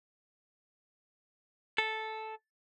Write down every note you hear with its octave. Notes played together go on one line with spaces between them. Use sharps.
A4